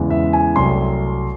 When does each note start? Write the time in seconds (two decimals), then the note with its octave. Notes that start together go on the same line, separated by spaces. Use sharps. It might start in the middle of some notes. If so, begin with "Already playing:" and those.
Already playing: E2 C#3 E3 G#3
0.10 E5
0.33 G#5
0.56 C2 C3 F#3 A3 C6